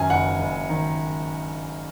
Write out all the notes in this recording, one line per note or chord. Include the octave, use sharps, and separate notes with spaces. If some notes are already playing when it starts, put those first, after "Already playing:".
Already playing: F#2 D#3 G#5
F#1 F#5
F#1
D#3